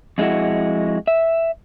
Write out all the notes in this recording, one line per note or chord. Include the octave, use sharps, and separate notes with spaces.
F2 G#3 A#3 E4 F#4
E5